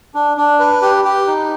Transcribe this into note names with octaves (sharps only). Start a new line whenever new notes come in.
D4
D4
B4
G4
G4
D#4